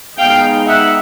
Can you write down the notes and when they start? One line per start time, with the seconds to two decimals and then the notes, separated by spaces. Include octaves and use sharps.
0.18 G#3 B3 D#4 F5 G5
0.68 E5 F#5